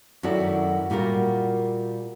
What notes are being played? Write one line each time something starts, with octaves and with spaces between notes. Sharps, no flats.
F#2 D#3 E4 F#4 A4 D5
A#2 G3 F4 F#4 A#4